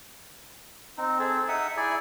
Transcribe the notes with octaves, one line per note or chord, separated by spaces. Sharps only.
C4 D#4
C4 G#4 A4
D#4 E5 F#5 D#6
E4 G#4 D5 G#5